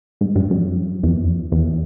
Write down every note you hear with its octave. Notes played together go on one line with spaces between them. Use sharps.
G#2
G2
F#2
F2
F#2
E2
F2
E2